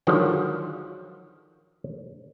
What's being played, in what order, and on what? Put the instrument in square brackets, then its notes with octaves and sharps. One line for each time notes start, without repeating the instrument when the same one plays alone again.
[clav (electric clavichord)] D3 D#3 F3 F#3 G#3